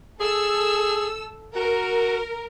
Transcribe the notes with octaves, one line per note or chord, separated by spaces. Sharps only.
G#4 A4 E6
F#4 A#4